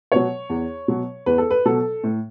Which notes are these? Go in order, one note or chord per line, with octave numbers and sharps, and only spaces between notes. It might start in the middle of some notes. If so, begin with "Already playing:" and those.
B2 F#3 C#5
E2
B2 F#3
E2 B4
A4
B4
B2 F#3 A4
A2